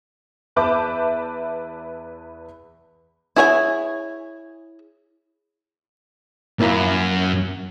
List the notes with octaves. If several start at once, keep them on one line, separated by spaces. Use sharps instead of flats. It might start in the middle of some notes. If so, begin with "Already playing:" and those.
E2 B4 E5 A5 D6 G6
E4 G#4 C#5 F#5 G#5
F#2 A#3 E4 A#5